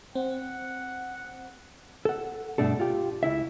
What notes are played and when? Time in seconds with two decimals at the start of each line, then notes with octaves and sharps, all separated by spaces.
0.15 C4 F#5
2.05 A4 F#5
2.58 G2 B2 A3 D4 A4
2.79 F4 G4
3.23 C#2 E4 E5